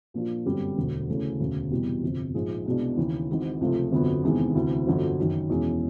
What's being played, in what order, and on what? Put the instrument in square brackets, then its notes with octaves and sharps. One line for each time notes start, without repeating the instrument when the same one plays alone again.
[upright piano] A#2 F3 A#3 D4 F4
G1 F#2 D3 G3 C4
E1 D2 D3
D2 C#3 E3 A3 C#4
E1 D2 C#3
F1 E2 B2 G3
G1 F2 C3
A#1 G#2 F3 G#3
C2 B2 G#3 B3 D4
D#2 C#3 E3
G#1 G#2 E3
C#2 C3 F3 A3
G1 F2 D3 F#3 B3
E2 C3 D#3 G#3 B3
D2 C3 E3
G1 F2 D3 F#3
F#1 F#2 D#3
E1 E2 B2 G#3 C#4